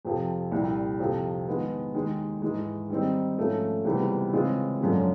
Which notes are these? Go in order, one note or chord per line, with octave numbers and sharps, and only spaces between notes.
F2 C3 F3
C2 A#2 G3
F2 C3 F3
D#3 G#3 B3
D#2 D#3 G#3
G#2 E3 G#3
D#3 G3 C4 D#4
G#2 F3 A3 C#4
C#2 C3 E3 G3 B3
C#3 E3 G#3 C4 F4
F#2 D3 F3 G#3 C#4